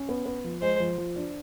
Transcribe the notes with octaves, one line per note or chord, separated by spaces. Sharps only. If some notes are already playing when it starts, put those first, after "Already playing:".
Already playing: C#4
B3
B3
F3
G#3 C5
F3
F3
D4